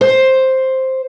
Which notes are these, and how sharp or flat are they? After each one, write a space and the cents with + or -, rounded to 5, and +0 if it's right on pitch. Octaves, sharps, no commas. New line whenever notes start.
C5 +5